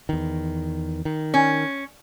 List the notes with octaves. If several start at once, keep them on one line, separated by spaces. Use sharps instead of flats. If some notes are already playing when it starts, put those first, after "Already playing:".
E2 D#3
D#3
C#4